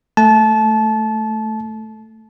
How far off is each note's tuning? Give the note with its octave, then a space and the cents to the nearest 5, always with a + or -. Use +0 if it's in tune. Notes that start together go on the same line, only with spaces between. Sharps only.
A3 +0 A5 -25